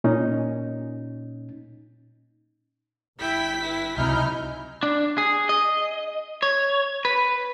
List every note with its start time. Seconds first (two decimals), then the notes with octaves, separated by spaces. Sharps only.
0.04 A#2 C#4 D#4
3.19 G1 E4 G5 B6
3.61 E4 B4
3.97 C#2 C3 F#3 D#4 E4 G#5 F6 G6
4.83 D4
5.18 G#4
5.49 D#5
6.43 C#5
7.05 B4